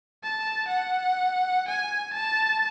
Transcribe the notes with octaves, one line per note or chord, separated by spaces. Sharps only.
A5
F#5
G#5
A5